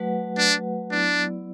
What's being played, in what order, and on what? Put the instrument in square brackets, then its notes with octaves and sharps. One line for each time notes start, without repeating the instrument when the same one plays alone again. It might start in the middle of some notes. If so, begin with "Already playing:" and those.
Already playing: [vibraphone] F#3 A3 F#4 B4 F#5
[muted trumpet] D4
[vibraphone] F#3 B3 E4 D5 [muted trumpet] D4